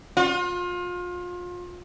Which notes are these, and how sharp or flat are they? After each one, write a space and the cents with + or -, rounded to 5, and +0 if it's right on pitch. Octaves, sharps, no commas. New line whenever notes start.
F4 +30